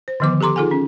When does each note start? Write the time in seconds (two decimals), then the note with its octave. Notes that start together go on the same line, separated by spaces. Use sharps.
0.08 C5
0.20 D3 D#3 F3 B3 D6
0.41 G4 A4 A#5 C6 D6
0.56 D#4 F4 G#4 A4 F#5 G#5
0.71 C#4